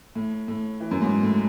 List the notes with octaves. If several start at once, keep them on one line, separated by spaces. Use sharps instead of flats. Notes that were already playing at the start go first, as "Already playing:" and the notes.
A2
A2
E3
F#2
G#2
A2